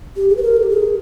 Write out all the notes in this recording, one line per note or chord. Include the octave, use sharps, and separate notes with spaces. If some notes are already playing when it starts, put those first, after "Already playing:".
G4
G#4
B4
A#4
A4
G4
G#4